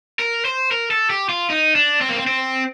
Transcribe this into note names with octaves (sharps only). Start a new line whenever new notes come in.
A#4
C5
A#4
A4
G4
F4
D#4
D4
C4
A#3
C4
C4